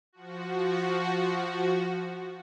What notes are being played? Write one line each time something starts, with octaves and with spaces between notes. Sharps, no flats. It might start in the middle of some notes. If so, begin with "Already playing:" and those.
F3 F#4